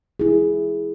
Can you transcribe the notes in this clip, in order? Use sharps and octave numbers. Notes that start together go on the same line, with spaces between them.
E4 G#4